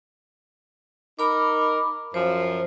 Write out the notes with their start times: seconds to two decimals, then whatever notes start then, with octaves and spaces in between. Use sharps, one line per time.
1.19 D#4 A#4 B5 D6
2.14 F#2 F3 C5